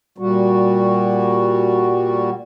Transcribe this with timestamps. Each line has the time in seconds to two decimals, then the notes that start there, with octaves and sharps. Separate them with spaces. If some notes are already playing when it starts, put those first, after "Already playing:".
0.18 A#2 G3 F#4